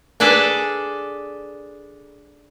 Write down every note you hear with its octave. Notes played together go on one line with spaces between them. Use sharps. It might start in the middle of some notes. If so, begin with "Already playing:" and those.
D4 G#4 A4 B4 D5